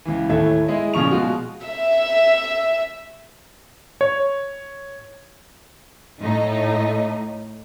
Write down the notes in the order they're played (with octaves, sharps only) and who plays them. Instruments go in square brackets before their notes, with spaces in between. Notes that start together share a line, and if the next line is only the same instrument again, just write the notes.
[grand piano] C#2 E3
D#2 A2 E3 A3 E5 G#6
G#3 E4 D#5
A#2 C#3 F3 C#6 F7
B2 G#3 F4 F#4
[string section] E5
[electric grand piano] C#5
[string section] A2 D#4